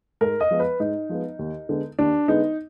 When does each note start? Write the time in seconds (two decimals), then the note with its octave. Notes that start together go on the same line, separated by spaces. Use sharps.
0.21 G#2 A#4
0.40 D#5
0.51 F3 G#3 B3
0.60 B4
0.80 G#2 D#4
1.09 F3 G#3 B3
1.39 D#2
1.69 D3 G#3 B3
1.99 D#2 D4
2.28 D3 G#3 B3 D#4